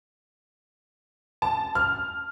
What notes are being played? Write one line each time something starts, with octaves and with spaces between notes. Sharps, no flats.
A5
F6